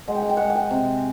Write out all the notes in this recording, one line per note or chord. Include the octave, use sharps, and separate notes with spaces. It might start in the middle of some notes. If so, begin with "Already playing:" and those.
G#3 F#5
G5
F#5
G5
G#3 F#5
F#5
G5
C3